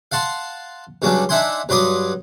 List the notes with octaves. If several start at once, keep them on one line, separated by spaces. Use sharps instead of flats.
F5 F#5 A5 C6
G2 C#3 F#3 C#4 D4
D4 D#4 E5 F#5 G#5 C6
G2 F#3 B4 C6 D6 D#6